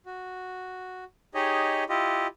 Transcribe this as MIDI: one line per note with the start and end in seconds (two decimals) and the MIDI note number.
0.06 1.04 66
1.34 1.84 63
1.34 1.84 67
1.34 1.84 68
1.34 1.84 73
1.34 1.84 75
1.89 2.27 64
1.89 2.27 65
1.89 2.27 67
1.89 2.27 75